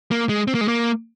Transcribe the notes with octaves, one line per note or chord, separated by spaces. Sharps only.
A#3
G#3
C4
A#3
G#3
A#3